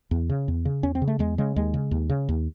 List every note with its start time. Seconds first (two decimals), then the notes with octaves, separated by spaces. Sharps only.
0.11 E2
0.29 C#3
0.48 E2
0.65 C#3
0.83 E2 C#4
0.95 C4
1.02 C#3
1.08 A3
1.19 E2 G#3
1.38 C#3 G#3
1.56 D#2 G#3
1.74 C#3
1.91 D#2
2.10 C#3
2.29 D#2